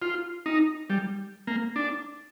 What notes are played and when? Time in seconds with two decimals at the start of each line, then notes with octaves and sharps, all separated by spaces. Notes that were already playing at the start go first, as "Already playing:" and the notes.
0.02 F4
0.46 D#4
0.90 G3
1.47 A#3
1.76 D4